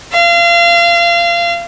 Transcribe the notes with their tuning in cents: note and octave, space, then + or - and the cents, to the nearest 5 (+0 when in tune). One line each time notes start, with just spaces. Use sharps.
F5 -30